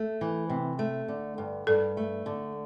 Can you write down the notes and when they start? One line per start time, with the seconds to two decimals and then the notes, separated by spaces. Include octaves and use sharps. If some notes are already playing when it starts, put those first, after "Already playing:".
Already playing: A3
0.21 E3
0.49 C3
0.79 A3
1.08 D3
1.38 G2
1.67 G2 A4
1.97 A3
2.26 D3